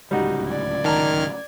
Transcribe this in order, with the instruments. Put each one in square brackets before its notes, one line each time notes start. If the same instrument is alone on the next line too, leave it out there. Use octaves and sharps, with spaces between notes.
[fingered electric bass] D1 C#2 [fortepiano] G3 D#4 F#4
[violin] D5 G#6
[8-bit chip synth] D#3 F6 [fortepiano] A5 A#5